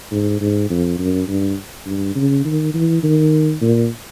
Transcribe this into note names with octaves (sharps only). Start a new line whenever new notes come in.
G#2
G#2
F2
F#2
G2
G2
C#3
D#3
E3
D#3
A#2